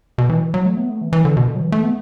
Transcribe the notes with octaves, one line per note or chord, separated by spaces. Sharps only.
B2
E3
F#3
A3
B3
A3
E3
E3
D3
B2
D3
F#3
E3
A3
B3